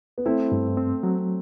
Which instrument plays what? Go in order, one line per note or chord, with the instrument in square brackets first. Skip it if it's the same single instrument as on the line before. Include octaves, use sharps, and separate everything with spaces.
[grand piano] B3
[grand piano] A3 C4 [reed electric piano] E4
[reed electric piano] G2
C4
F#3